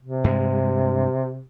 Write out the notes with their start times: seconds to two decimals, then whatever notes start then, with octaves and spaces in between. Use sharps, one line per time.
0.02 C3
0.24 G2 G#3